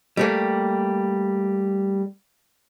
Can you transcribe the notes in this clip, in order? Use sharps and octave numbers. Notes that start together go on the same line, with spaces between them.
G3 A3 A#3